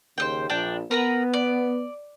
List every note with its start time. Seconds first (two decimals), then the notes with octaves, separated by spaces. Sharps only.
0.18 D#2 C#3 C5 D#5 G5
0.50 A#1 D4 G5
0.91 B3 A#4 B4 A#5
1.34 D5